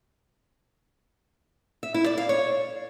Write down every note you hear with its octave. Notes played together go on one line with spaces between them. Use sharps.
E5
E4
D5
F5
C#5